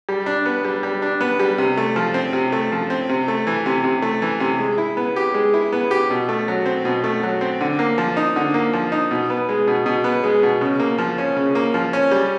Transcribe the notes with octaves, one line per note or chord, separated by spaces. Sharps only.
G3
D4
B3
G3
G3
D4
B3
G3
C3
A3
F3
C4
C3
A3
F3
C4
C3
A3
E3
C3
C3
A3
E3
C3
G#3
E4
B3
G4
G#3
E4
B3
G4
B2
A3
F#3
C4
B2
A3
F#3
C4
D3
A#3
F3
D#4
D3
A#3
F3
D#4
B2
B3
G#3
B2
B2
B3
G#3
B2
C#3
A#3
F3
C#4
C#3
A#3
F3
C#4
G3